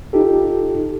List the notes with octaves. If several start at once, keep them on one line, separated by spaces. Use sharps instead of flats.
D#4 F4 G4 A4